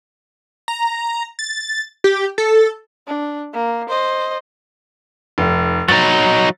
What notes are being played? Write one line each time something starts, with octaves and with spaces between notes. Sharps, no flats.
A#5
A6
G4
A4
D4
A#3
C5 D#5
F1
F#3 D#4 A6